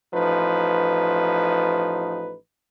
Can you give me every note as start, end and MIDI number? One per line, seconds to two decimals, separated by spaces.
0.14 2.35 33
0.14 2.35 53
0.14 2.35 63
0.14 2.35 71